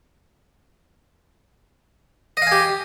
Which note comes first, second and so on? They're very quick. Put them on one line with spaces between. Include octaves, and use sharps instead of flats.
D#5 F5 G#5 G4